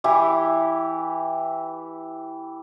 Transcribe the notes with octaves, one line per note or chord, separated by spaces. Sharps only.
E3 E4 G4